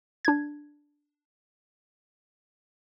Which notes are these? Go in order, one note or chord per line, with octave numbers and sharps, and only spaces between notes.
D4 G#6